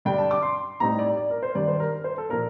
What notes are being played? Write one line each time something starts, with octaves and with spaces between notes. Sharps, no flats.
G2 D3 G3 D4 G5
A5
D6
C6
A2 G3 C4 D#4 A#5
D5
D5
A#4
C5
G2 D#3 G3 D4 D5
C5
A#4
C5
A4
A#2 F3 A#3 D4 A#4